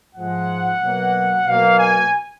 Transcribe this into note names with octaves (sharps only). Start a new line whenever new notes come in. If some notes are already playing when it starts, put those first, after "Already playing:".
G#2 F3 G#3 F#5
B2 F#3 A#3
B2 F#3 A#3 F5
G#5